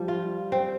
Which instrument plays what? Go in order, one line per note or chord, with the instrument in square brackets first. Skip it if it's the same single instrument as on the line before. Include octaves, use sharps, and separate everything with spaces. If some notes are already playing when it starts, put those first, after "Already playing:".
Already playing: [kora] F3 [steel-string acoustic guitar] G3
[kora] F4
C4